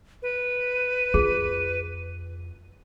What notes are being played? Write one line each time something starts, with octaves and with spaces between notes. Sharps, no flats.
B4
F2 F4 G#4